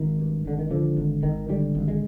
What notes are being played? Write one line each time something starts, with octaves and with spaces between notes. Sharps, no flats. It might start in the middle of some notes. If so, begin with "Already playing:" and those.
Already playing: G#1 D#3
G2
G#1 D3
D#3
D3 F3
G#1
G#1 D#3
D3 G3
G#1
G#3